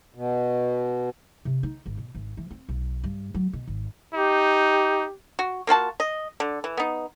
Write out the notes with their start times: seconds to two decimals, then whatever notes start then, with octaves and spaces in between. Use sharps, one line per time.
0.15 B2
1.45 C3
1.63 D#4
1.86 G#1
1.97 B2
2.15 G#1
2.37 E3
2.51 C4
2.69 B1
3.04 G2
3.34 F#3
3.53 B2
3.67 G#1
4.15 D#4 G4
5.39 F#4
5.67 A#3 F4 F#4 A5
6.00 D#5
6.40 D3
6.64 E3
6.77 B3 D#4